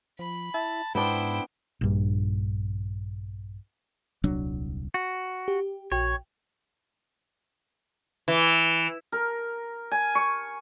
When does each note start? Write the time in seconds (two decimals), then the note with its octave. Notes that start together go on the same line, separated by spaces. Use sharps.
0.19 F3 B5
0.54 E4 A5
0.95 G#2 B3 D4 E4 C5 G5
1.81 A#1 G2
4.24 D#1 C2 F#3 D4
4.94 F#4
5.48 G4
5.92 A#1 F#4 C#5 G5
8.28 E3
9.12 A#4
9.91 G#5
10.15 C#6